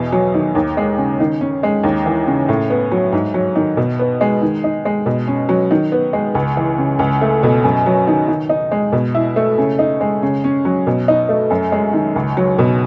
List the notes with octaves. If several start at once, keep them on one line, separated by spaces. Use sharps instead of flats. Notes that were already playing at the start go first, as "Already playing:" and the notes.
Already playing: E2 B2
F#3
D#3
D#2
G#3
C#3
D#3
C#4
G#3
D#2
E3
C#3
A2
B3
F#3
G#2
F#3
D#3
B2
B3
G#3
D#3
D#4
G#3
B2
C#4
F#3
D#3
B3
G#3
C#2
E3
C#3
C#2
A3
B2
F#2
F#3
D#3
D#3
D#4
G#3
B2
E4
A3
C#3
D#4
G#3
C#3
C#4
F#3
B2
D#4
A3
F#2
G#3
D#3
C#2
F#3
B2